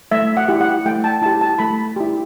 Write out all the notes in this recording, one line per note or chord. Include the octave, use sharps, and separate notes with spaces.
A3 E5
F#5
E4 G4
F#5
A3 G5
A5
E4 G4 A5
A5
A3 B5
E4 G4